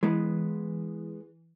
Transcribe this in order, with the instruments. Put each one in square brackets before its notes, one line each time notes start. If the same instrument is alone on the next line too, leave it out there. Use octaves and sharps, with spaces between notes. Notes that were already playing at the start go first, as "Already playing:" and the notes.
[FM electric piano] E3 [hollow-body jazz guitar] G#3 B3